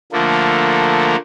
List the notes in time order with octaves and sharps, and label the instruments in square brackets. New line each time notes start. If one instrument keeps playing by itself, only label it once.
[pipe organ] D3 F3 A3 A#3